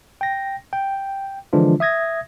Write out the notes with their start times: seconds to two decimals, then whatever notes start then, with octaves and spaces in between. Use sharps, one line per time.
0.21 G5 A#6
0.73 G5
1.53 D3 E3 F3 G#3 D4 F4
1.80 E5 D#6 G#6 A#6